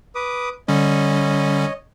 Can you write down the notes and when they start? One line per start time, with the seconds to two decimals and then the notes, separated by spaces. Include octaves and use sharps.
0.15 B4 D6 D#6
0.68 D3 G3 C#4 C#5 D#5